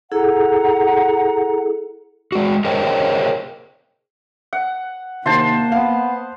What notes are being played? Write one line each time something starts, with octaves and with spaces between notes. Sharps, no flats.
E4 G#4 A4 F#5 A#5
G#3 F#4
G#4 A#4 C5 C#5 D#5 G5
F#5
C3 D#3 A#3 C5 A5 C6
B3 F5